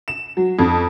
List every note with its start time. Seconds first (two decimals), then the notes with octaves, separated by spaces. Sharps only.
0.08 E7
0.37 F#3
0.59 F2